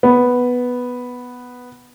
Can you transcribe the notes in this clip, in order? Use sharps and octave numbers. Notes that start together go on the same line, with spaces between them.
B3